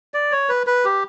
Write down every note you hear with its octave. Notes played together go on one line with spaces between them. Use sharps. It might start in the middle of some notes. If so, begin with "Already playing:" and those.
D5
C#5
B4
B4
G4